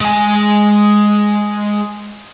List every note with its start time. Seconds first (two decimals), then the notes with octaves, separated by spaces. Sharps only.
0.01 G#3 G#5